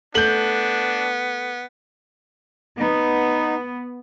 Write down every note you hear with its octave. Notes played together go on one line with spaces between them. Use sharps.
A3 B3 D4 G6 F#7
B3 D#4